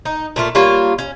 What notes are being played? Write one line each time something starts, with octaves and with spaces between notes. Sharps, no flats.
D#4
A#2 A3 F4
G3 A#3 F4 C#5
C#4